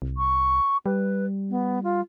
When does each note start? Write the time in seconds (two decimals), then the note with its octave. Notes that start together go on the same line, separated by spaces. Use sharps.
0.02 C2
0.17 C#6
0.86 G3 B4
1.50 B3
1.84 F4